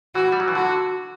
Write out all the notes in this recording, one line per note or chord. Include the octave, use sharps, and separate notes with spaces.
E3 F#4
G3
F#3
E3
D3 F#4